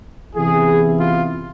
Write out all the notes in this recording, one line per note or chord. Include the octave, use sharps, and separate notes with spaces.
C3 E3 B3 E4 G#4
F4